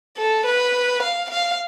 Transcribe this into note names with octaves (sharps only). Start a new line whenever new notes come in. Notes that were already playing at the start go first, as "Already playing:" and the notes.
A4
B4
F5
F5